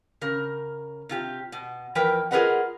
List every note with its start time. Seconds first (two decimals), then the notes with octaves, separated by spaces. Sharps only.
0.21 C#3 A#4
1.09 C3 F4 G4
1.52 B2
1.95 E2 F3 A#4 B4 G5
2.31 F4 G#4 A#4 B4 D#5 F#5